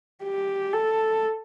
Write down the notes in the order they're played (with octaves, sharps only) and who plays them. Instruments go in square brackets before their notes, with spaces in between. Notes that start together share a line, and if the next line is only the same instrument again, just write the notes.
[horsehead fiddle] G4
A4